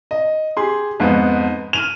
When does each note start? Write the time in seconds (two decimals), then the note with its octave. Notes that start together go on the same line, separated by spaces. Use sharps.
0.11 D#5
0.57 G4 G#4 C6
1.00 F2 G#2 B3
1.73 F6 D#7 F7